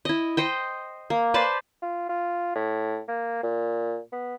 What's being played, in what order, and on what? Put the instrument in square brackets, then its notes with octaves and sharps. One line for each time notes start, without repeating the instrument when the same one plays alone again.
[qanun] E4 D#5
C5 D#5 G5
A#3
B4 C5 D5 A5
[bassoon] F4
F4
A2
A#3
A#2
B3